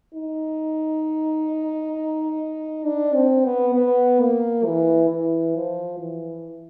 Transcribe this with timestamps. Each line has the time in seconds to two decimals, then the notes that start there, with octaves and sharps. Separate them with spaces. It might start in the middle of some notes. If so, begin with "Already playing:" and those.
0.14 D#4
2.85 D4
3.15 C4
3.45 B3
3.75 B3
4.20 A#3
4.66 E3
5.09 E3
5.55 F3
5.99 E3